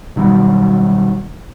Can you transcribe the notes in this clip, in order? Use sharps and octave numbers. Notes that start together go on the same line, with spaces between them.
B2 D#3 F#3 G3